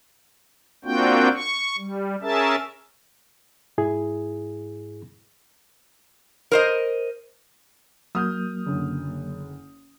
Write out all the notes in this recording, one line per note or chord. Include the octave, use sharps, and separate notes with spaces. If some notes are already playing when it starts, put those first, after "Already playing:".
A#3 C4 D4 F4 F#4 G5
C#6
G3
C#4 G#4 A#4 E5 A5
G#2 E4 G#4
A#4 C5 D#5
F#3 A#3 D#6 F6 G6
F#1 D3